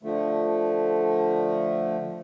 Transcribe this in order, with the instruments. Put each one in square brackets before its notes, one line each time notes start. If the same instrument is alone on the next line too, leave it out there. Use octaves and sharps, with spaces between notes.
[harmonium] D3 F3 A3